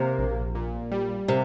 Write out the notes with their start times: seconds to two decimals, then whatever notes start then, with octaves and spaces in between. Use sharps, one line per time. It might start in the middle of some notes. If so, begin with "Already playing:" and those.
Already playing: C3 A#3
0.18 A#1
0.55 A#2
0.91 G3
1.28 C3 A#3